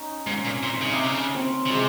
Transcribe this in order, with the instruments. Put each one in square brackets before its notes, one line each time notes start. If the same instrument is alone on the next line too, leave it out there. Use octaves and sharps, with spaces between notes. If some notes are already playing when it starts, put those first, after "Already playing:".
Already playing: [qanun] C#4 D#4
[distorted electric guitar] G#2 [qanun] C#4
[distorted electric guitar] A#2
[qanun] C4
[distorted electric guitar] A#2
[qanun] D#4
[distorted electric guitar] C#3
C3
[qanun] C#4
[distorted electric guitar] C#3
[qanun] C4
[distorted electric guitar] C#3
[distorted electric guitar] C3 [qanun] G#3